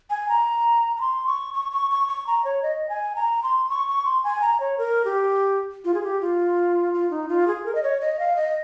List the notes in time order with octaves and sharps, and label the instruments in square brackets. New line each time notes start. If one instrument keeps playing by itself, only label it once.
[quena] G#5
A#5
A#5
C6
C#6
C#6
C#6
C#6
C#6
A#5
C#5
D#5
G#5
A#5
C6
C#6
C#6
C6
G#5
A#5
C#5
A#4
G4
F4
G#4
G4
F4
F4
D#4
F4
G#4
A#4
D#5
C#5
D#5
F5
D#5